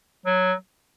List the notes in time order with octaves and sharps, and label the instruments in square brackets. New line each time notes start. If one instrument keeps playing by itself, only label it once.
[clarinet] F#3